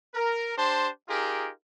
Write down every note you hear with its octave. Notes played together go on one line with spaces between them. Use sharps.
A#4
D4 G4 C5 A5 C6
D#4 F4 G4 G#4 A#4